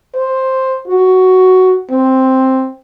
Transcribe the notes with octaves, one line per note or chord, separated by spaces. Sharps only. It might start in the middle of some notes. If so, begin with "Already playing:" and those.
C5
F#4
C4